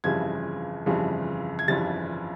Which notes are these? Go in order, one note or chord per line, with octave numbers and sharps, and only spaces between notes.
G1 F2 C#3 E3 G3 G#6
G1 F2 C#3 E3 G3
G#6
G1 F2 C#3 E3 G3 A6